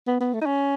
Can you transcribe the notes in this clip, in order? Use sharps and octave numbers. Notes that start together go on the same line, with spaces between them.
B3
B3
A3
D#4
C#4